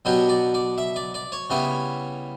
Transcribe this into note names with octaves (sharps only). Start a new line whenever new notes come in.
B2 F#3 B3 D4 G4
D5
D5
E5
D5
D5
C#5
C#3 G3 B3 E4